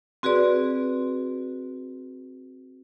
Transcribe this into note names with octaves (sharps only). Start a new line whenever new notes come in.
C4 F#4 G#4 B4 D5